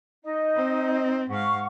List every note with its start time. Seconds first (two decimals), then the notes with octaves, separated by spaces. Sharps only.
0.23 D#4 D#5
0.55 C4
1.29 G#2 F5 F#5 C#6